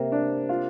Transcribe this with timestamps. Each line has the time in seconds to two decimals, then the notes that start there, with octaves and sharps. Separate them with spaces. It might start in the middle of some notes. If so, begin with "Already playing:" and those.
Already playing: C3 A#3
0.12 D4
0.49 F4